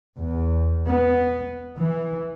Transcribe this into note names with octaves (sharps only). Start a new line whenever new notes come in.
E2
B3
E3